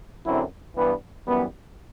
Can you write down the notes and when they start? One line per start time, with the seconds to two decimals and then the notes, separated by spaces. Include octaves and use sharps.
0.25 F#2 D3 F#3 C4 E4
0.76 G2 E3 G3 B3
1.26 F#2 E3 G3 B3